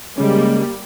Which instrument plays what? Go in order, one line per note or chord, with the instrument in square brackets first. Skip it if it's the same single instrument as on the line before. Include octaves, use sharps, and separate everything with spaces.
[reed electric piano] C#3 C#4 [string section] G3 A#3 [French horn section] G#3